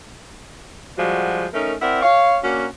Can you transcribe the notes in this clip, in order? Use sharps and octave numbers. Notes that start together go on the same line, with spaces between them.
F3 G3 G#3 F#4
A3 C#4 D#4 A#4
C4 E4 A#4 D5 F#5
C#5 F5
A#3 C#4 D4 F#4